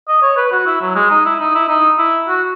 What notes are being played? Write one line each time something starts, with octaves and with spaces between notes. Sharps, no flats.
D#5
C#5
B4
F#4
E4
F#3
G#3
D#4
E4
D#4
E4
D#4
E4
F#4